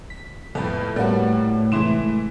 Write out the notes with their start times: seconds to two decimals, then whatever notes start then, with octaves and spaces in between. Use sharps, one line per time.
0.10 B6
0.55 F2 A2 A4 B4 A5
0.96 A2 G3 A#3 F#4 B4 C#5 A5
1.72 C3 E3 G#3 A3 C6 E7